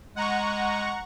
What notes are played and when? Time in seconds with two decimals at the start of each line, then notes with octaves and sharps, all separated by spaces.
0.16 G#3 F#5 A#5 C#6